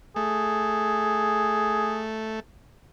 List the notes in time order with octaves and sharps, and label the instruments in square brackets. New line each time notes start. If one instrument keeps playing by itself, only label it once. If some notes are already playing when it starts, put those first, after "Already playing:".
[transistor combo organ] A3 [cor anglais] G#4